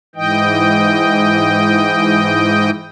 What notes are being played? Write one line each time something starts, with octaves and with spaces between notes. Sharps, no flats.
G#2 E3 D#5 G5